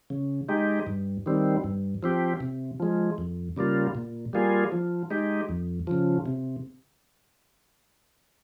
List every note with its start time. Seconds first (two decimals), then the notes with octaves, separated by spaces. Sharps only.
0.10 C#3
0.49 G#3 D#4 G4
0.87 G2
1.26 D#3 G3 C4
1.64 G2
2.03 F3 C4 G4
2.40 C3
2.80 F3 G#3
3.18 F2
3.56 C#3 G3 A#3 F4
3.95 A#2
4.33 G3 A#3 F4 G#4
4.72 F3
5.10 G#3 D#4 G4
5.49 F2
5.87 C#3 F3
6.26 C3